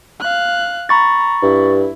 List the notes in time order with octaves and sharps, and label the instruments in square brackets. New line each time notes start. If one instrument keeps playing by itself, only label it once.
[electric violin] F5 F#6
[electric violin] A#5 [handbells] B5 C#6 A6
[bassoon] G2 [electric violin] E4